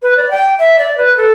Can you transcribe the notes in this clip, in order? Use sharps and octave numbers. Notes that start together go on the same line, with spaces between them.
B4
D5
G5
E5
D5
B4
A4